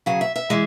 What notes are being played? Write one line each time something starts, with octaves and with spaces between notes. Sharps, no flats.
C#3 F#3 G#4
E5
E5
E3 G#3